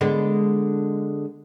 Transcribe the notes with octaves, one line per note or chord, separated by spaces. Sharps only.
D3 G#3 B3